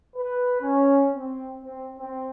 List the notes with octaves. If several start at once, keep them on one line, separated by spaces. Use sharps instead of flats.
B4
C#4
C4
C4
C4